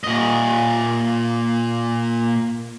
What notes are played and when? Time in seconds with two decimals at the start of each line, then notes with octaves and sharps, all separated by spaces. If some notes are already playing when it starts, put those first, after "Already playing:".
0.04 A#2 D#5